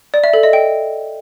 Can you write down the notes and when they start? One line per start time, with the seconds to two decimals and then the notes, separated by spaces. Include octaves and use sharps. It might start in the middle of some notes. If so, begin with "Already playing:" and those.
0.14 D5
0.24 E5
0.33 A4
0.43 D#5
0.53 G5